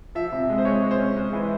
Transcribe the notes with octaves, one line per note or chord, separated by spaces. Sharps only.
F3 E5
C3
G#3
C5
G#3 C#5
G#3
C5
C#4
G#3
E3